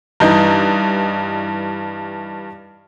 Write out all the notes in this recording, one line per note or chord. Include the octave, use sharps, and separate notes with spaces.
G2 E3 D#4 D#5 G6